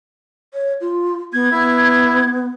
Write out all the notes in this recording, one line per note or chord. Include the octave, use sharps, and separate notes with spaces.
C#5
F4
B3 G#6
B3 E4